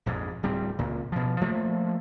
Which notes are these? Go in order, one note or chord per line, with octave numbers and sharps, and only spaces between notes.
A#1 F2 G#2
D1 G3 C4
C#2 A#2
B2 F3
F3 A3 A#3